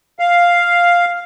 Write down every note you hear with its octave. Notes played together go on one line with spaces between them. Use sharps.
F5